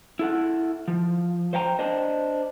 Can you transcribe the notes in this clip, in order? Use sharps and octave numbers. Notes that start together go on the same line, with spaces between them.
E4 A4 F#5
F3
C5 F5 G5 A#5
D4 C5 D#5